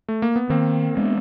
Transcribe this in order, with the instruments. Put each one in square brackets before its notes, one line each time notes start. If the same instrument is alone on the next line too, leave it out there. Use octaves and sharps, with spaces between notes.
[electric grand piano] A3
A#3
B3
[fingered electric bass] D#3 [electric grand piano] A#3 C4
[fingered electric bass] G#3 B3 D4